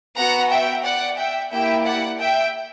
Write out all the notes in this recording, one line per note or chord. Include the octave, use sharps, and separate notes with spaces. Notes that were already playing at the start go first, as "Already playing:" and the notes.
B3 F#4 F#5 A#5
E5 G5
D5 F#5
E5 G5
A#3 E4 G4 E5 G5
D5 F#5
E5 G5